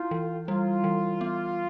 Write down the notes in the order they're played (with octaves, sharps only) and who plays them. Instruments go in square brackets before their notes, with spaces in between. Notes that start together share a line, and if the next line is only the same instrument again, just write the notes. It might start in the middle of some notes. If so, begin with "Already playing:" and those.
Already playing: [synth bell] E4 [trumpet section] F4
[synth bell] E3
[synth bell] G3 [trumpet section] F4
[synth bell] E3
B3